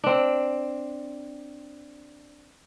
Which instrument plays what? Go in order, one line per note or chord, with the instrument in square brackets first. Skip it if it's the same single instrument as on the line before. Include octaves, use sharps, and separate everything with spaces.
[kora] C4 D4